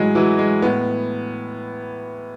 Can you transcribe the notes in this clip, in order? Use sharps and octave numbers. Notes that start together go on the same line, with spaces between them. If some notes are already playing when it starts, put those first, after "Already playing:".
Already playing: A2 E3 F#3 G#3
E3 F#3
G#3
A2 B3